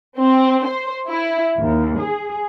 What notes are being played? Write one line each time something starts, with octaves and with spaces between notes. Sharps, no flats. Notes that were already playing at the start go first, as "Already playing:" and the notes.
C4
C5
E4
D#2
G#4